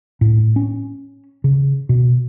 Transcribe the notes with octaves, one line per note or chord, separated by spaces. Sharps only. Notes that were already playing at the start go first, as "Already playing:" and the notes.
A2
C#4
C#3
B2